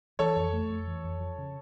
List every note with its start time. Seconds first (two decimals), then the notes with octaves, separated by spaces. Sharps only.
0.19 E3 A4 C#5
0.36 F2
0.53 A3
0.70 F2
0.87 E3
1.04 F2
1.20 F3
1.38 C#3